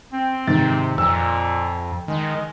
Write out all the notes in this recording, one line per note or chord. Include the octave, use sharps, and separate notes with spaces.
C4
G#2 C3 D#3 A6
F2 A#2 E6
D#3 G#3